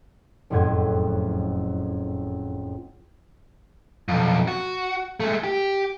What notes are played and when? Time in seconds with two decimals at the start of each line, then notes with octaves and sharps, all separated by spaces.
0.50 F#1 F2 A2 F#5 G#6
4.08 B1 F2
4.48 F#4
5.20 G#3 A3
5.44 G4